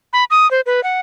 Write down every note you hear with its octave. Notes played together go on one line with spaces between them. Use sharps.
B5
D#6
C5
B4
F#5